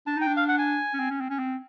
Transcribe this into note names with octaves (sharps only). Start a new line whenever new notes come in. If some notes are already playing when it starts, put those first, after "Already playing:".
D4 A5
D#4
G5
D4
F5
F#5
G#5
C#4
C4
C#4
C4
C#4
C4